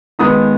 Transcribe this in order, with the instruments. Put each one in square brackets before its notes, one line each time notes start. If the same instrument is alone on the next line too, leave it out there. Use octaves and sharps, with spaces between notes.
[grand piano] D#3 G#3 B3 D#4 D#6